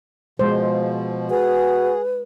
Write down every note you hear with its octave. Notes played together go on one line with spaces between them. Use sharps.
B2 F3 G#3 C5
F#4 G#4 B4